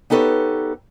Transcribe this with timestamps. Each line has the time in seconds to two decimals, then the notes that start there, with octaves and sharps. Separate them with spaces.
0.10 B3 D#4 G4 A4 B4 C#5